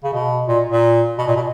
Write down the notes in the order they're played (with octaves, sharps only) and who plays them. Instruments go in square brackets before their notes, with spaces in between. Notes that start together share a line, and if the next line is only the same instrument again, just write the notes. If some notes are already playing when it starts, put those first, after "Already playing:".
[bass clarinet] C#3
B2
A#2
A#2
B2
A#2
B2